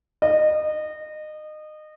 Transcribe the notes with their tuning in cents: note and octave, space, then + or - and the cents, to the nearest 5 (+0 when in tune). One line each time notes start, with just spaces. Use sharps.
D#5 -25